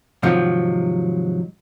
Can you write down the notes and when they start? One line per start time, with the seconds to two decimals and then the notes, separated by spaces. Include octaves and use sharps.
0.23 G#2 C3 D#3 F3 F#3